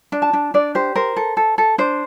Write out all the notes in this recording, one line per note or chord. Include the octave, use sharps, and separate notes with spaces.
D4
A5
D4
D4 D5
G4 C5
A#4 C5
A4
A4
A4
D4 C5